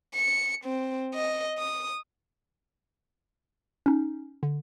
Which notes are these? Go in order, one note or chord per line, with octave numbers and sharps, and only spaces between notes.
C#7
C4
D#5
D#6
C#4 D#4
D3